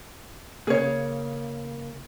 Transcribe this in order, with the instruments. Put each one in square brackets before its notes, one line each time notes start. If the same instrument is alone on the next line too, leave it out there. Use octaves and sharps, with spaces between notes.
[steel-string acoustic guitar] C#3 A#3 [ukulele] G#4 C#5